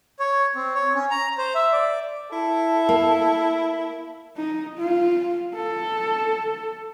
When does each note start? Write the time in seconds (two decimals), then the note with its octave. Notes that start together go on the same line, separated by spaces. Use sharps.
0.19 C#5
0.55 C4
0.75 C#5
0.95 C#4
1.11 A#5
1.38 C5
1.55 E5
1.72 D5
2.32 E4 A4
2.89 A#3
4.37 D#4
4.78 F4
5.54 A4